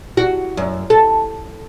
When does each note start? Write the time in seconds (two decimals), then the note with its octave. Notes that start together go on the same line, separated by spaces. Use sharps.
0.17 F#4
0.57 F#2
0.90 A4